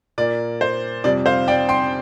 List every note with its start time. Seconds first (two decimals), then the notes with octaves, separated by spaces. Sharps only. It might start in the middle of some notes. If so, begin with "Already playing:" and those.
0.18 A#2 A#3 D5
0.61 C5
1.04 F2 C3 G3 D5
1.26 C5 F5
1.48 D5 G5
1.69 G5 C6